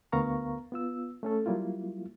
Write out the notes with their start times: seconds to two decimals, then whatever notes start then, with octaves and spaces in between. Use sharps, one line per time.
0.12 D2 B3 A#4 F5 A#5 C#6
0.72 B3 F4 E6
1.23 A3 C#4 A4
1.46 F#3 G3 A#3 E4 F4